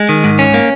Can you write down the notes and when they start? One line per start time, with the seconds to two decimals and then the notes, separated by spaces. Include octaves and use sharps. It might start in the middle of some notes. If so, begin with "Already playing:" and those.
Already playing: G#3
0.09 D#3
0.24 G#2
0.39 C#4
0.54 A#3